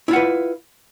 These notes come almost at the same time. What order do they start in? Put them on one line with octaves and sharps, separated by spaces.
E4 F4 F#5 B4